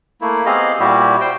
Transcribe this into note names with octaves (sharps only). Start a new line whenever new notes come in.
A3 A#3 E4
B3 C4 G4 G#4 D#5 F5
A#2 G3 E4 F#4 G4
C5 G5